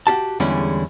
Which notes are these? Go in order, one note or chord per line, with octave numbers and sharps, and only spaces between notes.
F#4 G4 A5
E2 D3 G3 G#3 C#4 E4